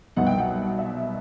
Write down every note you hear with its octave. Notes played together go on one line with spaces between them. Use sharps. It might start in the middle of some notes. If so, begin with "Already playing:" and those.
C2 B2 F#3 B3 D#4 F#5
G5
F#5
E5